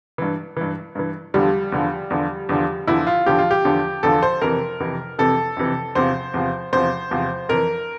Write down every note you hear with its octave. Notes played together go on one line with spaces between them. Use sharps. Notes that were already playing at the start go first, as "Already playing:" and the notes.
G2 E3
G2 E3
G2 E3
E2 D3 F3 G3
E2 D3 F3
E2 D3 F3
E2 D3 F3
E2 D3 F3 E4
F4
E2 D3 F3 G4
F4
G4
E2 D3 F3
E2 D3 F3 A4
C5
F2 C3 E3 A#4
F2 C3 E3
F2 C3 E3 A4
F2 C3 E3
E2 C3 F3 C5
E2 C3 F3
E2 C3 F3 C5
E2 C3 F3
F2 E3 A#4